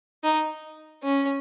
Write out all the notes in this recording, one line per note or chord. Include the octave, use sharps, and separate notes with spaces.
D#4
C#4